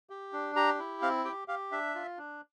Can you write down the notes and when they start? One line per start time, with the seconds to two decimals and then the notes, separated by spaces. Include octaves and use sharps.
0.10 G4
0.33 D4
0.56 G4 A#5
0.79 E4
1.02 C4 F5
1.25 G4 G5
1.48 G4 F5
1.72 D4 E5
1.95 F4
2.18 D4